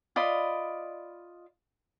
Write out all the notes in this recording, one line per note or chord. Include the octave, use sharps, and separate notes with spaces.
F4 D5 D#5 B5